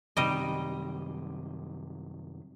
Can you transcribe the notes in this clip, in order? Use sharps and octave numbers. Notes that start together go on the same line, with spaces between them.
F#2 C3 D#3 G3 D#5